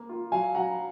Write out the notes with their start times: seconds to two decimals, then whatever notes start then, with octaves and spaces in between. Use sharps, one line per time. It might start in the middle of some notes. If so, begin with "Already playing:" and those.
Already playing: A#3
0.09 F4
0.32 F#3 F5 G#5
0.55 F#3 F#5 A#5